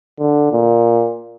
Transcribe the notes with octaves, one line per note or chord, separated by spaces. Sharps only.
D3
A#2